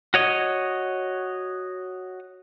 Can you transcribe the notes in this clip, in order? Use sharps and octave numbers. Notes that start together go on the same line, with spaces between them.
F#4 C#5 D#5